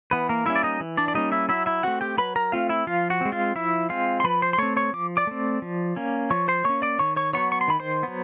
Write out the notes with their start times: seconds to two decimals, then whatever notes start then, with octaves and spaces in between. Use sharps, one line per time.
0.11 E3 B3 B4
0.29 A#3 A#4
0.46 G3 A#3 C#4 E4 E5
0.56 D5
0.63 D#4 D#5
0.80 E3
0.97 D4 D5
1.08 D5
1.14 G3 A#3 C#4 D#4 D#5
1.32 E4 E5
1.49 F#3 E4 E5
1.66 E4 E5
1.83 A3 C4 F#4 F#5
2.01 G4 G5
2.18 F#3 B4 B5
2.36 A#4 A#5
2.52 A3 C4 F4 F5
2.69 E4 E5
2.87 F3 F4 F5
3.10 F#4 F#5
3.21 G#3 C4
3.32 F4 F5
3.55 F3 E4 E5
3.89 G#3 C4 F4 F5
4.20 C6
4.24 F3 B4 B5
4.42 C5 C6
4.53 C6
4.58 A3 C4 C#5 C#6
4.77 C#5 C#6
4.93 F3 D6
5.17 D5 D6
5.27 A3 C4
5.62 F3
5.96 A#3 C#4
6.30 F3 C#5 C#6
6.48 C5 C6
6.64 A#3 C#4 C#5 C#6
6.82 D5 D6
6.99 D#3 C#5 C#6
7.16 C#5 C#6
7.33 F#3 B3 C#5 C#6
7.52 C#6
7.61 C6
7.68 D#3 B5
7.80 C5 C6
8.03 F#3 B3